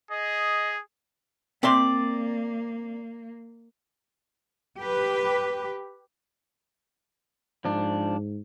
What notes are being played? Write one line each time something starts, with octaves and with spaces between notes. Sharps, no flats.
G#4 D#5
A#3 C4 D5 E5 C6
G4 B4
G#2 F3 D4